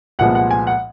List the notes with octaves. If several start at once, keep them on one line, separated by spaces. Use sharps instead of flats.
C2 A#2 F3 G#3 B3 F#5
F#5
G#5
F#5